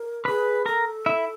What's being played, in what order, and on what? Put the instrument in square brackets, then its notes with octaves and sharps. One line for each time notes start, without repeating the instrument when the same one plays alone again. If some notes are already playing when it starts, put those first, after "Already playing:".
Already playing: [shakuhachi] A#4
[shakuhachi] G#4 [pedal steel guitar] B4 B5
[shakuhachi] A4 [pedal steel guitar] A#4 A#5
[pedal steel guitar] E4 E5